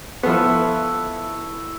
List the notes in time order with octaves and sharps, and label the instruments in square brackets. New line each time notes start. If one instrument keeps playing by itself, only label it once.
[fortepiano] F3 B3 [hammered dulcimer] E4 A4 C#6